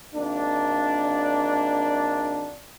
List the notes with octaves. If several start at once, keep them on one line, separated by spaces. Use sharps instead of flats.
G#1 A#3 D4